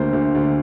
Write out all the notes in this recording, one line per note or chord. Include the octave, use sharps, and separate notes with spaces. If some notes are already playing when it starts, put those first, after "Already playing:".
Already playing: D2 A#3 C5
D2
D2